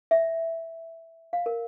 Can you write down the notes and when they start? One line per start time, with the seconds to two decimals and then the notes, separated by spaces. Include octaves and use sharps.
0.11 E5
1.33 F5
1.46 A#4